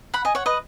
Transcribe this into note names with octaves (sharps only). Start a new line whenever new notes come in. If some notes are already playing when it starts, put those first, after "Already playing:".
F#5 B5
D#5 G#5
C#5 F#5
B4 D#5